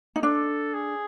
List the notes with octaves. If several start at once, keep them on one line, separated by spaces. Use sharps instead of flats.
D#4
D4 A4
G#4